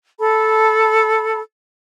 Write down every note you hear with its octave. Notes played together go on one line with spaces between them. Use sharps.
A4 A5 B5